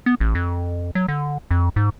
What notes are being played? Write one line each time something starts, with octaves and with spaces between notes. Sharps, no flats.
B3
A1
F2
F#3
D3
F2
G#2